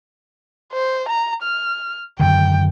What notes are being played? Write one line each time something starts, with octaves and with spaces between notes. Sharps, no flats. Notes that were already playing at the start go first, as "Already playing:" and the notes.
C5
A#5
F6
F#2 D3 D#3 G5